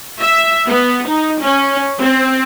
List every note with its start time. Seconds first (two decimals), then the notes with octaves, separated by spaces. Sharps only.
0.20 E5
0.67 B3
1.07 D#4
1.41 C#4
1.99 C4